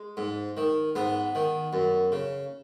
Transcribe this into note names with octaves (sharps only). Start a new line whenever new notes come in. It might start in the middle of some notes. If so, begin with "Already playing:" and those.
Already playing: G#3
G#2
D#3
G#2 B3
D#3
F#2
C#3